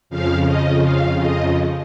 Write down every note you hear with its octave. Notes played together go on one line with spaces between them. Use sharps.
F2 C#3 F3 F5
D#5
F5
D#5